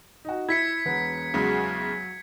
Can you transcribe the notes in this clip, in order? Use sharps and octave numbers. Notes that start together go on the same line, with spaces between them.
D#4 F#4
E4 G#6 B6 C#7
E1 B3
E2 C#3 F#3 G#3